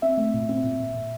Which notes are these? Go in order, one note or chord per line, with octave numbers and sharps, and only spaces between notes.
C4 E5
A3
A#2
C4
A#2
A#2
A#2